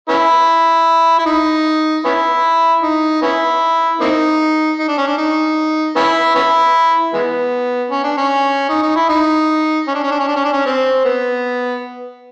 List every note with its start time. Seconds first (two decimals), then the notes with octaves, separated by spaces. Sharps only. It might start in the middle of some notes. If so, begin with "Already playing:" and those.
0.09 B3 C#4 E4
1.19 E4
1.26 D#4
2.05 B3 C#4 E4
2.83 D#4
3.22 B3 C#4 E4
4.01 A#3 C4 D#4
4.79 D#4
4.88 D4
4.98 C#4
5.07 D4
5.18 D#4
5.96 B3 C#4 E4
6.35 B3 C#4 E4
7.13 E3 G#3 B3
7.91 C#4
8.04 D4
8.18 C#4
8.70 D#4
8.83 D#4
8.96 E4
9.09 D#4
9.88 C#4
9.95 D4
10.04 C#4
10.12 D4
10.20 C#4
10.28 D4
10.37 C#4
10.45 D4
10.53 C#4
10.66 C4
11.05 B3